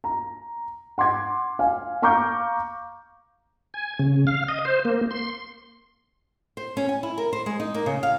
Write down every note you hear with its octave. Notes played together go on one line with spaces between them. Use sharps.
A#5
F#5 C6 D6 G#6
F5 G#5
F5 A#5 C#6 D6 F6 G6
G#5
C#3
F5
D#5
C5
A#3
C6
C5
C#4
G#5
E4
A#4
C5
G#3
D#4
A#3
C#3
F5